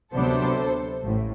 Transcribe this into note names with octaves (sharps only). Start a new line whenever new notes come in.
D2 C3 F#3 B3 D4 A4 C5
A1 A2